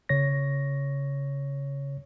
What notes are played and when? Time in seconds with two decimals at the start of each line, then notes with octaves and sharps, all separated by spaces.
0.09 C#3 C#5 A#6